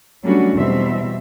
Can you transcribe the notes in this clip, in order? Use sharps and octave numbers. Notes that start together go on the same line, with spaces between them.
F#3 G3 A3 C#4 D4 F#4
E2 B2 G3 C4 E5